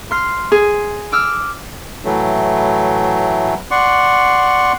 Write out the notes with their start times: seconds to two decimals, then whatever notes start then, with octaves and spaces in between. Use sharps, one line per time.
0.11 C6 F6 C7
0.52 G#4
1.12 D6 E6 F6
2.05 A2 E3 F#3 A3
3.71 D5 F#5 C6 C#6